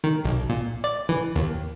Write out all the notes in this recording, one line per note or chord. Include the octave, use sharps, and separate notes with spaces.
D#3
B1
A#2
D5
E3
D#2